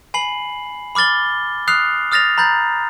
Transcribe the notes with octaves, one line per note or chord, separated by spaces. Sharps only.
G#5 B5 C7 F#7
B5 D6 F6 A6 G7
D#6 F6 F#6 C7 F7
D#6 F6 A6 A#6 F7
A#5 B5 G6 A6